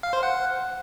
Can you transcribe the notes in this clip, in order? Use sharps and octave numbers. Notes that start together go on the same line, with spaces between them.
F5
C5
F#5